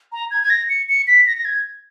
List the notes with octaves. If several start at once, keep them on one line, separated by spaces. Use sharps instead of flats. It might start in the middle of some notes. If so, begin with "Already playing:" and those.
A#5
G#6
G#6
A#6
C#7
C#7
B6
A#6
A#6
G#6